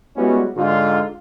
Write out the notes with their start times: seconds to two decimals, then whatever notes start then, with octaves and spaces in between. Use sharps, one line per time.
0.16 G3 G#3 B3 C#4 E4 F#4
0.56 G#2 D3 F4